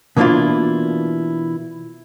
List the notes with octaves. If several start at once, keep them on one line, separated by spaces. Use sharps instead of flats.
B2 E3 A#3 D4 E4 F4